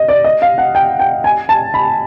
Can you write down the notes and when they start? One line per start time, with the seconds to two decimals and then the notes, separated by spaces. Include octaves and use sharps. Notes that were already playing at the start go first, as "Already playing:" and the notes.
Already playing: D#5
0.09 D5
0.24 D#5
0.42 F5
0.58 F#5
0.75 G5
0.99 G5
1.24 G#5
1.49 A5
1.74 B5